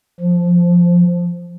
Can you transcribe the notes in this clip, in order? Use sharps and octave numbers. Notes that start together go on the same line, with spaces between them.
F3